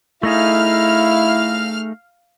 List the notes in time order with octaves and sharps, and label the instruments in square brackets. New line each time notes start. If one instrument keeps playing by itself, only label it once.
[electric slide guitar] A3 D#4 G#4 [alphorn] E4 [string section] F5 F6